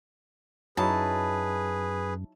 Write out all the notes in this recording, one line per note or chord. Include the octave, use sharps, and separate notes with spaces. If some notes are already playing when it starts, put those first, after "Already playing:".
F#2 F#3 D#4 E4 G#4 B4 A5